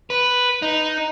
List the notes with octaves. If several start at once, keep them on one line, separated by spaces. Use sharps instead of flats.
B4
D#4